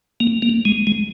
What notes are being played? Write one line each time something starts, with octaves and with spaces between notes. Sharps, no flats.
A#3
A#3
G#3
G#3